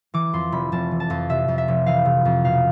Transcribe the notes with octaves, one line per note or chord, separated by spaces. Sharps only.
E3 D6
F2 C6
F1 B5
F1 A5
E3
A5
F2
C3 E5
F2
E5
F1
E3 F5
C3
F2
B2 F5